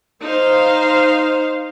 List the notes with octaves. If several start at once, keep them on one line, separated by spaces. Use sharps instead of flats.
D#4 C5 F5